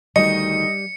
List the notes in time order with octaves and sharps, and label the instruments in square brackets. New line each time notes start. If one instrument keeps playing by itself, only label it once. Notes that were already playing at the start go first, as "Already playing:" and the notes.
[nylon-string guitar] D2 D#3 F#4 [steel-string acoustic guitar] G3 [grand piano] D#5 [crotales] C#7